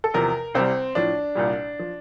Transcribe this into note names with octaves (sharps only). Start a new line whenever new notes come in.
A4
E2 C3 F3 A#4
C2 C3 G3 C4
A2 F3 D4
C2 A#2 G3
F3